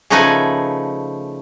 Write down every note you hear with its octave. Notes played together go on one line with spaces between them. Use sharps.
C#3 F3 A3 D#4 B4 G#5